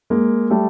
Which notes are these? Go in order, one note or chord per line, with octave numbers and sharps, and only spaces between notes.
G#3 A#3
G3 A3